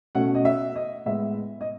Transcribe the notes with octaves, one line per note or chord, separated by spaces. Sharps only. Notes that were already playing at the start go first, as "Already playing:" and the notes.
B2 A3 C#4 F#5
D#5
E5
D#5
A2 G#3 B3 E5
D#5